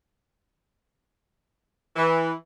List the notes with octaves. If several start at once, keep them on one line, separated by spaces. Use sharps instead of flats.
E3